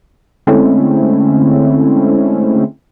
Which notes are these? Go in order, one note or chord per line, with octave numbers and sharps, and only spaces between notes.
D3 G#3 A3 C4 C#4 E4